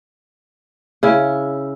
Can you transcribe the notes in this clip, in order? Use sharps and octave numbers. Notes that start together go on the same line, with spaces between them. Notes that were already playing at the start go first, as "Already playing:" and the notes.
C#3 E4